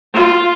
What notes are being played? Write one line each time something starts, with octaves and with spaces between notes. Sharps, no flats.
F4